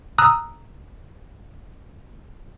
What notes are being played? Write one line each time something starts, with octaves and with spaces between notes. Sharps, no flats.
A#5 D#6 E6 F#6